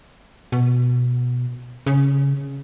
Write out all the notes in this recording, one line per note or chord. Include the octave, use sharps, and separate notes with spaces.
B2
C#3